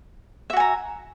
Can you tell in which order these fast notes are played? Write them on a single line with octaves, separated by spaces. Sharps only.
E5 F#4 G#5 A#5